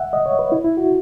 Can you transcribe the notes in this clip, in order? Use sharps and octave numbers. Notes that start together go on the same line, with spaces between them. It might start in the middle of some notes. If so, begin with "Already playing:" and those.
Already playing: E5 F#5
D#5
C#5
B4
E4
E4
F#4